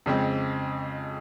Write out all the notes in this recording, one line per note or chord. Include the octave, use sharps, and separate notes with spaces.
F2 C#3 G#3 C4